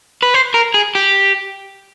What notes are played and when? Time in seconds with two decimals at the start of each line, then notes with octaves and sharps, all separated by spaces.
0.22 B4
0.34 C5
0.54 A#4
0.74 G#4
0.95 G4